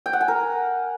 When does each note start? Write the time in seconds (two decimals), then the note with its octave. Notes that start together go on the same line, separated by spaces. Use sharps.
0.06 G5
0.13 F#5
0.21 G#5
0.28 A#4